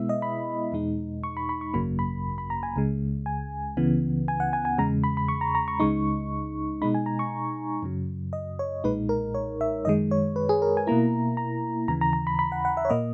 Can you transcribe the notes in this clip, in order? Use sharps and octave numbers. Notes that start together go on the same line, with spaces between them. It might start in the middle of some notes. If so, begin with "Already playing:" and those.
Already playing: B2 G#3 B3 E4 E5
D#5
B5
E2 B2 G#3 D#4
C#6
B5
B5
C#6
G#1 F#2 C#3 F#3 A#3 B5
B5
B5
A#5
G#5
C#2 C#3 G#3
G#5
C#2 C#3 E3 B3
G#5
F#5
G#5
G#5
E2 C#3 G#3 A#5
B5
B5
C#6
A#5
A#5
C#6
C#2 C#3 G#3 D#4 C#6
B2 G#3 D#4 B5
G#5
A#5
C#6
F#2 C#3 F#3
D#5
C#5
B1 A#2 G#3 D#4 B4
A#4
C#5
E5
F#2 D#3 G#3 D#5
C#5
B4
G#4
A#4
G#5
B2 A#3 E4 A#5
A#5
D#2 C#3 E3 A#5
A#5
A#5
B5
B5
F#5
F#5
E5
C#5
A#2 A#3 D#5